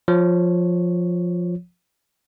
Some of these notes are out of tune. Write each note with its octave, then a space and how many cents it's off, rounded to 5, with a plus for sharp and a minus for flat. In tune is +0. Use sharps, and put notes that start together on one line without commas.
F3 +10 C#5 +0